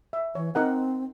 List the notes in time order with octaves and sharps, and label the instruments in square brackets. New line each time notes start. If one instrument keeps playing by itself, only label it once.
[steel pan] E5
[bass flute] E3 [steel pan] C#5
[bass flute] C4 [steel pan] D#4 A#4 F#5